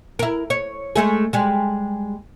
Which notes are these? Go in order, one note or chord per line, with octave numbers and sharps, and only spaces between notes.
E4 A#4
C#5
G#3 A3 G#4
G3 G#3